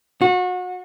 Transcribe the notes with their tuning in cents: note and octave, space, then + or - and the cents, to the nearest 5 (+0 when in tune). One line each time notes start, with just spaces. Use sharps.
F#4 -30